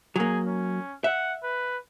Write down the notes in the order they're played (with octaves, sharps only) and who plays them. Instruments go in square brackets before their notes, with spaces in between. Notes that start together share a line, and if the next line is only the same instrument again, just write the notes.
[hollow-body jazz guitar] F#3 A#3 [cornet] G#4
[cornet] C#4
[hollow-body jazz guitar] E5 [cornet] F#5
[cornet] B4